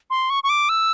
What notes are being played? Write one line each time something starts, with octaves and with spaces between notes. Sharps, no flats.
C6
C#6
C#6
D6
E6